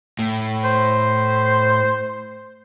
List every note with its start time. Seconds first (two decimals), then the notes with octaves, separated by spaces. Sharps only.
0.19 A2
0.64 C5